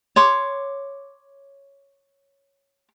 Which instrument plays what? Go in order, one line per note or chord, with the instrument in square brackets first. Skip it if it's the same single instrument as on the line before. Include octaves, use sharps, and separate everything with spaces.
[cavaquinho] C#5 C6 D6